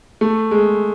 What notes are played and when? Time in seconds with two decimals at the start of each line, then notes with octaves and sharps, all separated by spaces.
0.21 A3
0.51 G#3